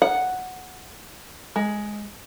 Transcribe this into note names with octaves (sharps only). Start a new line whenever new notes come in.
F#5
G#3